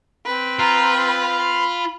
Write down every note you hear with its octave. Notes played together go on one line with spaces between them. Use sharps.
C4 B4
F4 A#5
B5